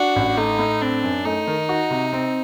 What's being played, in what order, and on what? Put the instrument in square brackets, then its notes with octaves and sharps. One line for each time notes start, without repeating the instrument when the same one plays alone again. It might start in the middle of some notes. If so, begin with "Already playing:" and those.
Already playing: [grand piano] D4 [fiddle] F#4
[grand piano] A1
[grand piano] A3 [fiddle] D#4
[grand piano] A2
[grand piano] C4 [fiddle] D4
[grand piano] F#2
[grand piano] A3 [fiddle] D#4
[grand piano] D#3
F#4
C3
C4